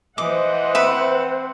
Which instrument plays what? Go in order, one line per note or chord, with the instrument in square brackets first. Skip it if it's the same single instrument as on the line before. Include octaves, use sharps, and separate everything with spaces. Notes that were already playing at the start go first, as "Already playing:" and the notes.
[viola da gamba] E3 [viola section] C5 F#5 [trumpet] D#5 [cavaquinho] D6
[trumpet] C4 [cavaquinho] B4 E5